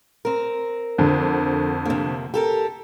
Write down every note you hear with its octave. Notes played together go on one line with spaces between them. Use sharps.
C4 A#4
F2 D3
C3 A#3
G4 A4 A#4